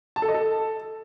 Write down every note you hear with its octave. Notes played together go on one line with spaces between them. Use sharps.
A5
A4
D#5
A4